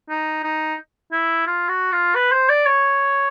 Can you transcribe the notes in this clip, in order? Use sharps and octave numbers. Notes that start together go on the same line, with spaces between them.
D#4
D#4
E4
F4
F#4
F4
B4
C5
D5
C#5